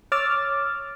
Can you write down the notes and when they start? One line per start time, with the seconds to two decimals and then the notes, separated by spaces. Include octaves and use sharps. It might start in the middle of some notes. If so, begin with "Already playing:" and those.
0.12 C#5 D6 E6 F6 A6